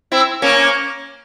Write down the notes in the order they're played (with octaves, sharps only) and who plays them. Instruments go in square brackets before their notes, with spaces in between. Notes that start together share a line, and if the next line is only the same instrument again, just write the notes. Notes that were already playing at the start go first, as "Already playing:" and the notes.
[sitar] C4 E4
A#3 C#4